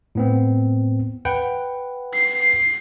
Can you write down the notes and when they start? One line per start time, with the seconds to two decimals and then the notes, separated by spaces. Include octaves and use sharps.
0.15 A2 B3 C4
1.25 B4 F#5 G5
2.14 C7